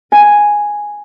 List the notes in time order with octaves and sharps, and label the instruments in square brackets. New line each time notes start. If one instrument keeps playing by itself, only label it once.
[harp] G#5